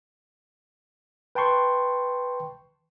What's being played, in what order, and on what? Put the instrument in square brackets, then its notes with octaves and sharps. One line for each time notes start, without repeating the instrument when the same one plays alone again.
[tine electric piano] B4 G5 A5 C6 C#6